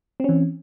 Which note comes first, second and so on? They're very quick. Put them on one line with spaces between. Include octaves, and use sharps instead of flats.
C4 C#4 E3